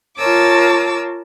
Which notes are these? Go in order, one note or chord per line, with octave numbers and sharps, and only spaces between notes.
F4 A#4 C#5 A5 D6 E6